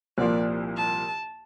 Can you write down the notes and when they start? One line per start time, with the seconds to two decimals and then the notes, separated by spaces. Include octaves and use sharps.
0.18 C2 A#2 F3 A#3 D5
0.77 A5